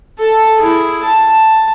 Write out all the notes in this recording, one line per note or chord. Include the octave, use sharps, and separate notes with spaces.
A4 A5
E4 G#4
A5